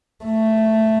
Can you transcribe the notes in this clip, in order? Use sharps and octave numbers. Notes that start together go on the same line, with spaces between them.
A3